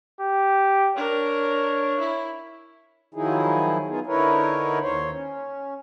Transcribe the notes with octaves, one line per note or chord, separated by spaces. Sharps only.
G4
D4 A#4 C#5
E4
D#3 F3 F#3 D#4 E4 G#4
B3 D#4 F4 G#4
D3 D#4 E4 A#4 B4 C#5
D#2 C5 C#5
C#4